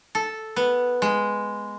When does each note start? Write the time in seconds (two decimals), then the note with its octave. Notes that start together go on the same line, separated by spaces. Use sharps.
0.15 A4
0.56 B3
1.02 G#3